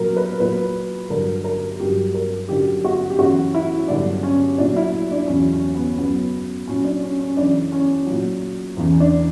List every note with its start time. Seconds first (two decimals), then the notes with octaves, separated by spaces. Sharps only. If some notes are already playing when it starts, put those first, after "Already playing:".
Already playing: A#2 F#3 A#4
0.16 B4
0.39 A#2 F#3 B4
1.10 G2 D3 F#3 A#4
1.44 A#4
1.79 G2 F#3 G4
2.14 A#4
2.49 F#2 D3 F#3 G4
2.85 F#4
3.10 G4
3.19 F#2 C#3 E3 F#4
3.54 E4
3.88 G2 D3 F#3 D4
4.23 C#4
4.58 A#2 F#3 D4
4.76 E4
5.11 D4
5.28 E2 C#3 F#3 C#4
5.52 C#4
5.75 B3
5.97 F#2 C#3 F#3 B3
6.68 A#2 F#3 C#4
6.85 D4
7.02 C#4
7.20 C#4
7.37 F#2 C#3 E3 D4
7.72 C#4
8.07 A#2 F#3
8.77 E2 C#3 E3
9.00 D4